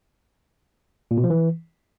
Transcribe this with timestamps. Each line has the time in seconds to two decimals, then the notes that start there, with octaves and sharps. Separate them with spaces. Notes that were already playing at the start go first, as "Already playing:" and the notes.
1.11 A#2
1.17 B2
1.24 F3
1.30 E3